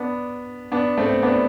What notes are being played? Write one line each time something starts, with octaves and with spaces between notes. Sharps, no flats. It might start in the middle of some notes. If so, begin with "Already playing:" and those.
Already playing: B3 D4
B3 D4
A3 C4
B3 D4